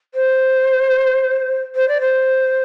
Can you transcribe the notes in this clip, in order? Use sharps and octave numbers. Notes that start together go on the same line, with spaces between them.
C5
C5
D5
C5